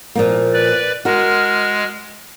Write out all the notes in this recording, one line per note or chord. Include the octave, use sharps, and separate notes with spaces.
A#2 F3 A#3
B4 D5
G#3 F#4 A#4 F6